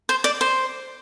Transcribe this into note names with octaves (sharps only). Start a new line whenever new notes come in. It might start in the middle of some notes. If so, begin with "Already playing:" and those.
C5
D5
C5